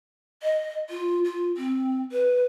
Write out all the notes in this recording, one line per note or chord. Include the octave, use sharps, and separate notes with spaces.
D#5
F4
F4
C4
B4